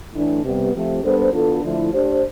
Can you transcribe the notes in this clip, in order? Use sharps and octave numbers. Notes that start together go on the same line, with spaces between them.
A2 E3 A3 D4
C3 G3 B3
C3 F3 A3
G3 B3 D4 A4 C5
E3 B3 D4 F4 A4
D3 F3 A3 E4
A3 D4 G4 C5